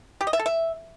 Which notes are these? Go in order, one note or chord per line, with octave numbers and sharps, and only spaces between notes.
G4
D#5
E5
A4
E5